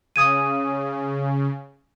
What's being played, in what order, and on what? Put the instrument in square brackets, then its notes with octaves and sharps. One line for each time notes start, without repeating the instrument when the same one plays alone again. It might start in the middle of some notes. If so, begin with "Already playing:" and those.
[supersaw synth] C#3 [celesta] D#6 G#6 D#7